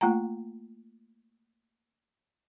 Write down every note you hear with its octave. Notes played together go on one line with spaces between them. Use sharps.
A3 A#3 F4 F#5 G5 A#5